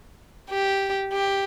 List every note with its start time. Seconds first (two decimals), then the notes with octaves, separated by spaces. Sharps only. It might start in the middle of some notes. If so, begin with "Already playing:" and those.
0.50 G4
1.13 G4